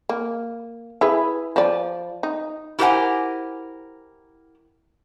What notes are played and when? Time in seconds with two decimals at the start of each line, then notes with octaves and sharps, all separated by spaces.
0.09 A#3
1.01 E4 G#4 B4
1.56 F3 D5
2.23 D#4
2.79 E4 G4 A#4 C5 F#5 G#5